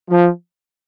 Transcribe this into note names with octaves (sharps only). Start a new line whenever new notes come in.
F3